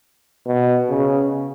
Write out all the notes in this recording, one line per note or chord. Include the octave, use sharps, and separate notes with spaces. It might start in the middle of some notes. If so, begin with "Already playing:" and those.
B2
C#3